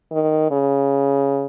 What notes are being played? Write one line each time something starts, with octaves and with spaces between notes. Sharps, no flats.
D#3
C#3